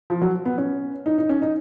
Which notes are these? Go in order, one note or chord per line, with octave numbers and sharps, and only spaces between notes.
F3
F#3
B3
C#4
D#4
D#4
C#4
D#4